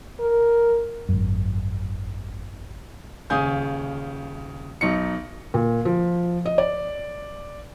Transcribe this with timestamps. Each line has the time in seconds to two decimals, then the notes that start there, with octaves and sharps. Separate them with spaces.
0.20 A#4
1.09 G#1 F#2
3.30 D#1 C#3 F5 G#5 D#6 G6
4.81 B1 D#4 C#7
5.54 A#2
5.85 F3
6.46 D#5
6.58 D5